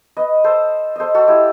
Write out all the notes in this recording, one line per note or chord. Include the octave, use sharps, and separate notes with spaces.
B4 D#5
A4 C5
A4 C5 D#5
F#4 A4
E4 G4